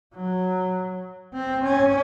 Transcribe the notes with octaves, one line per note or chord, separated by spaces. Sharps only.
F#3
C4
C#4